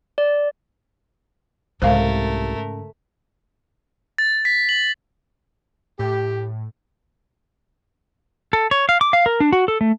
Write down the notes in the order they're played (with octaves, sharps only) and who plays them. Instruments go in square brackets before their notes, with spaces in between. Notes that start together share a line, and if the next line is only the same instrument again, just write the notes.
[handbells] D5
[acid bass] C2 [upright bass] G#2 C#3 [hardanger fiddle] A3 A#4 [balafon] C5 F5
[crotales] A6
B6
F#7
[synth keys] A2 [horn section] G4
[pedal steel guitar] A4
C#5
F5
D6
F5
A#4
D4
F#4
A4
A3